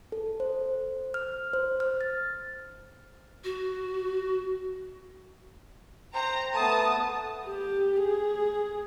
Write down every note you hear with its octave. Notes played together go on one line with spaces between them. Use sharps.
A4
C5
F6
C5
F6
A6
F#4
C5 G5 A#5
A3 B3 A5 D#6
G4
G#4